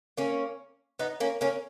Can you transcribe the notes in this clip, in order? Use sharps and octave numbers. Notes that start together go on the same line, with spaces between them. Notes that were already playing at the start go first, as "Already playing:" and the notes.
A#3 C#4
B3 D#4
A#3 C#4
A#3 C#4